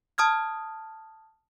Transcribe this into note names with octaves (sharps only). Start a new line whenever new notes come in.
A5 D#6 F6 G#6